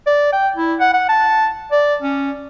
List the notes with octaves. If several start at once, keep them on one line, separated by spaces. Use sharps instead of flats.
D5
G5
E4
F#5
F#5
A5
D5
C#4